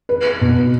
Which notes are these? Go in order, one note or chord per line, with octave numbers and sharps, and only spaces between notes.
B4
B2